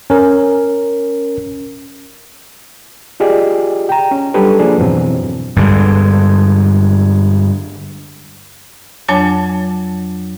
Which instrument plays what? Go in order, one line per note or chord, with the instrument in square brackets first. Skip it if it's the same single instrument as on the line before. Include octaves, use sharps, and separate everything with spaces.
[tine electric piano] C#4 A#4
[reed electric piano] F4 G4 G#4 D5 D#5
G5 A#5
C#4
F#3 G3 D4 G4 A4 B4
F3 A#3 D4 G#4
F2 G#2 B2 E3 F#3 C4
[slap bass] G2 D3 G#3
[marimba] F2 F#3 D4 C#5 G#5 A5